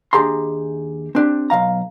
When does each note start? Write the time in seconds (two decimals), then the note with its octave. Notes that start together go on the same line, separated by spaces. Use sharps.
0.13 D#2 D4 G4 G#4 A#5 C6
1.15 C4 D4 G4
1.50 B1 B2 F5 A#5